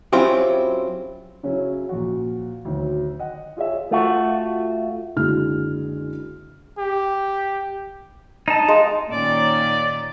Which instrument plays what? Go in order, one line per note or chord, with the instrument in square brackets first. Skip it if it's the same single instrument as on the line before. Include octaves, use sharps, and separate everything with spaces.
[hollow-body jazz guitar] F#3 C4 C#4 E4 F4 G4
[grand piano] C#3 F#3 C#4 E4
A#2 F3 F#4
D2 D#3 F#3
D#5 F#5
F4 G#4 C#5 E5
[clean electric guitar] A3 F4 F#4
[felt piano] F#1 D3 G#3 F#4 G#4 F6
[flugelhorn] G4
[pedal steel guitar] D#4 A5
[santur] G#3 F5 C6
[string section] A#2 D#3 C#4 [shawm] D5